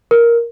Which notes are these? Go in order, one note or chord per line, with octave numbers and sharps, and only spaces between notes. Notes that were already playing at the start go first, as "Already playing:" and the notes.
A#4